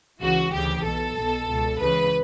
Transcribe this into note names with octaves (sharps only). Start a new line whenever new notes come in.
C#2 C#3 E3 F#4
D2 C#3 E3 G4
B1 B2 A4
B1 B2
C#2 B2
C#2 C#3 E3 B4